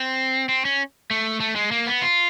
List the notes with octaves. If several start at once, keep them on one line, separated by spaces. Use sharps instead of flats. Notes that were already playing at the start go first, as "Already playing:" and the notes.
Already playing: C4
C4
C#4
A3
A3
G#3
A#3
B3
F4